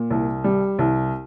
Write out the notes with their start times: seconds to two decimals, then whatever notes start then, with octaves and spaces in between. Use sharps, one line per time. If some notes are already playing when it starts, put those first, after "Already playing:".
Already playing: A#2
0.11 C2
0.44 G3
0.79 C2